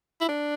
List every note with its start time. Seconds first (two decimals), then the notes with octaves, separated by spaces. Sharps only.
0.21 E4
0.29 D4